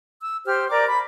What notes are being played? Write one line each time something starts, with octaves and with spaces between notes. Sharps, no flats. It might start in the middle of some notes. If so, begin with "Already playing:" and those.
E6
G4 C5 F6
A#4 D5 A#5 D6
B5